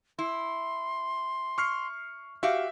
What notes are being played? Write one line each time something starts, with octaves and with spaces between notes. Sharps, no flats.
E4 C6
C#6 F6 C7
F#4 G4 E5 F5